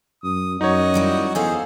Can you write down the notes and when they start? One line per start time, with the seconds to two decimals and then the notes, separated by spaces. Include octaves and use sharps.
0.23 F#2 D#6
0.61 F#2 D#4 F#4 C#5 D#5
0.94 D#2 G3 E4
1.35 E2 G#4 A4 C5 F5